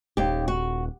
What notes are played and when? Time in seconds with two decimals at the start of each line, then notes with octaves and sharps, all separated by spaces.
0.17 D#1 D#2 G4
0.48 F#4